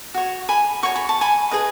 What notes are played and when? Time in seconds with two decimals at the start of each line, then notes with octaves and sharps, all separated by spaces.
0.14 F#4 C#5
0.49 G#5 B5
0.83 F#4 C#5 C#6
0.96 B5
1.09 A5
1.21 G#5 B5
1.51 G#4 B4 D#5